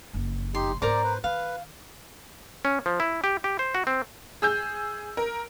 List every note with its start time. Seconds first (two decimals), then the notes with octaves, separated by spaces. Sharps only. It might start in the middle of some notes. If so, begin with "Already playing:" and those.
0.13 F#1 F2
0.55 D#4 G4 C6
0.82 G#2 B3 A#4 C5 D5 A#5 D6
1.04 B4 C5
1.24 D#3 B4 F5
2.65 C#4
2.86 F3
3.00 E4
3.24 G4
3.44 G4
3.59 C5
3.75 F#4
3.87 C4
4.42 G#4 E6 G6
5.17 A#4